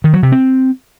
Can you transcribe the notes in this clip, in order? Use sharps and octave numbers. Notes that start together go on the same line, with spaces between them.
D#3
F#3
C3
C4